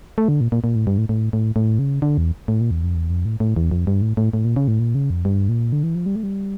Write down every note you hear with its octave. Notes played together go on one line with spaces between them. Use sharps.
A3
D3
A#2
A#2
A#2
A2
G2
A2
A2
A2
A2
C#3
D3
E2
A2
A#2
E2
F2
E2
F2
A2
A2
E2
F2
G2
A2
A2
A2
A#2
C#3
A2
A#2
C#3
F2
G2
A#2
D3
E3
F3
G3
A3
G3